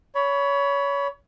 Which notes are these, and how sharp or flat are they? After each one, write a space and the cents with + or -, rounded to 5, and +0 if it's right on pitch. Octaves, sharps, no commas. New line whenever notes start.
C#5 +25 B5 -5